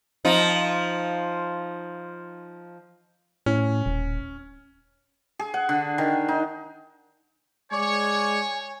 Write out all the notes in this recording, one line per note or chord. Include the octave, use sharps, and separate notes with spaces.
F3 D#4
A2 C#4
D#1
G#4
F#5
D3
D#3
D#4
G#3 C#5 D5 G#5 C#6